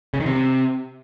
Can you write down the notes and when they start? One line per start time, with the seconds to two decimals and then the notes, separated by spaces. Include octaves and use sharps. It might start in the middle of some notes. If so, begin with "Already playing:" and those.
0.14 C#3
0.20 D#3
0.26 C3